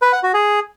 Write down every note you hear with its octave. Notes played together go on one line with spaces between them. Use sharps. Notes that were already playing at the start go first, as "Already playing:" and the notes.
B4
F#5
F#4
G#4